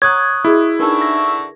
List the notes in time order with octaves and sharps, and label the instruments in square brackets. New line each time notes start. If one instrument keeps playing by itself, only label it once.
[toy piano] C#5 F#5 A#5 [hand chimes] C#6 D#6 F#6 [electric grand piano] G#6
[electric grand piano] E4 [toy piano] F#4 G#4 D#5
[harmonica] D3 E5 C#6 [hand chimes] D4 D#4 [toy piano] A#4 B4 A5
[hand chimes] A#6